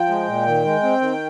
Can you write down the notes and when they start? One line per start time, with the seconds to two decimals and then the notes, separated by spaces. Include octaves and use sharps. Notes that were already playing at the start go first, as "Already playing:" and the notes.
Already playing: F3 G5
0.09 G#3
0.27 A#2
0.46 D#3
0.65 G#3
0.83 C4
1.01 D#3